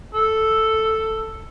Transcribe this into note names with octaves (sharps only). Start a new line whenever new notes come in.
A4